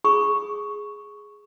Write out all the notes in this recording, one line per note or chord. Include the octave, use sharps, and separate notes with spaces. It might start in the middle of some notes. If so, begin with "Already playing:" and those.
G#4 B5 C#6 D#6